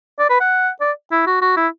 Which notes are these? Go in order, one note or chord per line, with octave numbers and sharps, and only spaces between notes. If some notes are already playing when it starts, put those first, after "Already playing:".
D5
B4
F#5
D5
E4
F#4
F#4
E4